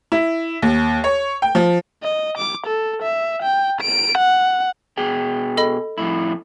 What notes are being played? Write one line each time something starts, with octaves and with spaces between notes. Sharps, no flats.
E4
D#2
C#5
G5
F3
D#5
D6
A4
E5
G5
D7
F#5
B2 G#4 G5
A4 D#5 B5
F2 A2 E4